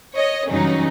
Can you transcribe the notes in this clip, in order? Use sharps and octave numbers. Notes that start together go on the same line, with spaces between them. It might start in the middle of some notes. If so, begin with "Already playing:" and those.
C#5 D#5
G2 C#3 E3 F#3 C#4 D#4